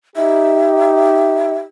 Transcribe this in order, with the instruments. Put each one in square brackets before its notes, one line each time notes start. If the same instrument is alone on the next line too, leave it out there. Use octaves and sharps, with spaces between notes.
[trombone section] D#4 G4 [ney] E5